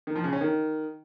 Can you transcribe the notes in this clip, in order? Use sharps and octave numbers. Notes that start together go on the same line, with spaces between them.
D#3
F3
C#3
C#4
D#3